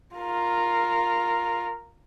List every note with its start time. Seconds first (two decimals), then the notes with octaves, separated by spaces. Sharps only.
0.15 F4 A#4